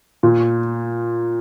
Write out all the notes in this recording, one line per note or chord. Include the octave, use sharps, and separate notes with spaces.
A#2